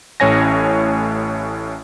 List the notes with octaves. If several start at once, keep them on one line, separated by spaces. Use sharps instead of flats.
A1 A2 C#4 C#5 G#5 A#6